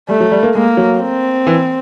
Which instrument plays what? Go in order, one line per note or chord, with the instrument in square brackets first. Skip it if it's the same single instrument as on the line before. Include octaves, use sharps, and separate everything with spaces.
[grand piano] G3 [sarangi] A3
[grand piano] F#3
G3
A#3
[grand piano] G#3 [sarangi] A#3
[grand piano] F#3
[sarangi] C4
[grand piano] E3